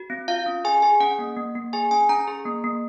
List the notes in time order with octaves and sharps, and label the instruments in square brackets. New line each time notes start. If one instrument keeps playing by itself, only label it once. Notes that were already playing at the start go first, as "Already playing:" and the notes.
Already playing: [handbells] F#4
C4
F4 F5
C#4
G#4 G#5
G#4 G#5
C#4 F#5
A#3
A#3
A#3
G#4 G#5
C#4 G#5
C#4 A#5
G#4
A#3
A#3